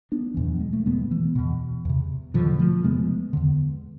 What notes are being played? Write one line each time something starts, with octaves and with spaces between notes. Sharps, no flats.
B3 D4
E2 B2 E3
F3
G#3
A3
E2 B2 G#3 B3
E3
E2 B2
E2 C3
E2 B2 D3 F3
F3 A3
E2 C3 G#3 B3
E2 D3